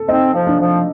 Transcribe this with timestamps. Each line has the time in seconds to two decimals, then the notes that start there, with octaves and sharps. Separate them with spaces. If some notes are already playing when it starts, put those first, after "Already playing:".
Already playing: A4
0.08 C4 D#4
0.33 F3
0.47 D4
0.60 F3